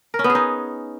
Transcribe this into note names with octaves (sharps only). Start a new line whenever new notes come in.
A#4
C#4
B3
G#4
D#4